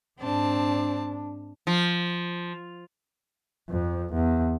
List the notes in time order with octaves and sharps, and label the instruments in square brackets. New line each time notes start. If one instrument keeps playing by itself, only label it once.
[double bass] G#2 D4 [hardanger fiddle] C4 A5
[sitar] F3
[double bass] F2
E2